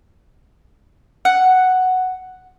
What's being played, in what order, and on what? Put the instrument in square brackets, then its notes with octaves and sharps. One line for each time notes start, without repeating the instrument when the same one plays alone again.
[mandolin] F#5